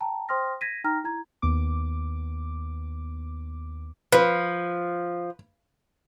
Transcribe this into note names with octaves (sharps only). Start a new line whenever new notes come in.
G5 A5 A#5
C5 G5 C6 D#6 F6 A#6
G#6 A#6 B6 D#7
D#4 G5 A#5 F6 A#6
E4 A#5 G#6
D#2 B3 D6
F3 B4